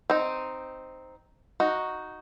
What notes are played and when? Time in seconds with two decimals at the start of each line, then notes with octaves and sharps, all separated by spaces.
0.10 C4 D#4
1.60 D#4 F#4